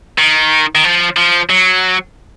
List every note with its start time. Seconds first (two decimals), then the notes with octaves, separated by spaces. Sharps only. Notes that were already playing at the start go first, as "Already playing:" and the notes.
0.18 D#3
0.75 D#3
0.84 F3
1.17 F3
1.49 F#3